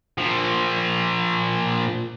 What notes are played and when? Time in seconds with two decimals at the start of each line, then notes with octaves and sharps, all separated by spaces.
0.18 A#2 F3